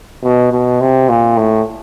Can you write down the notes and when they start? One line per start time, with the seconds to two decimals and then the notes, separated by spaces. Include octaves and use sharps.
0.24 B2
0.52 B2
0.81 C3
1.09 A#2
1.37 A2